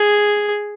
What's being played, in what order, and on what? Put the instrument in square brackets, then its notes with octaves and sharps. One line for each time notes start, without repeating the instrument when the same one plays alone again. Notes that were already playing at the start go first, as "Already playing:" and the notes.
Already playing: [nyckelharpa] G#4